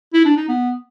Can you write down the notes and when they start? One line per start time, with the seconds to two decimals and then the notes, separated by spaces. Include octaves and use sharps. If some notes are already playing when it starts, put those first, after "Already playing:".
0.14 E4
0.25 D4
0.37 D#4
0.49 B3